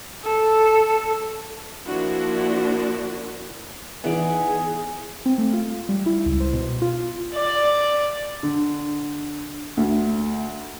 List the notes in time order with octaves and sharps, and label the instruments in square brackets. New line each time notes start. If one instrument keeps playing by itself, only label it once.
[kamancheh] A4
[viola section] F3 A#3 D4 E4 F#4
[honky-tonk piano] E3 D#4 E4 [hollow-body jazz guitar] B3 D5 [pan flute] G#4 [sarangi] G#5
[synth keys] C4
A3
F4
G3
E4
C#2
C5
B2
F4
[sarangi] D5
[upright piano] D3
D2